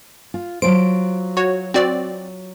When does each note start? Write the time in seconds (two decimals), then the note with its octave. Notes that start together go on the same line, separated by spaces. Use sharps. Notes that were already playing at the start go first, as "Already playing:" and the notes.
0.34 F4
0.62 F#3 F4 C5 D7
1.37 F#4 C#5
1.74 C4 F#4 D5